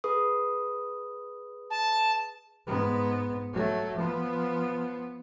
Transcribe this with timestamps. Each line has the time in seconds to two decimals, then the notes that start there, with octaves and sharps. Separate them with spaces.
0.04 G#4 B4 D#6
1.70 A5
2.66 G#2 B3
3.53 F#3 A3
3.96 F3 B3